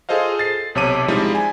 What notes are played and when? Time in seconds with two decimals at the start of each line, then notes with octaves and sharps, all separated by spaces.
0.09 F4 G#4 A4 C5 D#5 F5
0.39 A6 C7
0.75 B1 C3 C#5 A5 D6 D#7
1.08 F3 G3 G#3 C4 D#4 E4
1.35 G#5